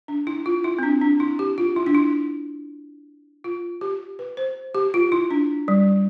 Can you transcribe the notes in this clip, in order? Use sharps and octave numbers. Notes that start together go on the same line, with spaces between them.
D4
E4
F4
E4
C4
D4
D4
E4
G4
F4
E4
D4
E4
F4
G4
B4
C5
G4
F4
E4
D4
G3